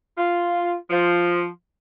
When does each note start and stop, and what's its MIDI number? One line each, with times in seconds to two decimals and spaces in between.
0.17 0.75 65
0.90 1.46 53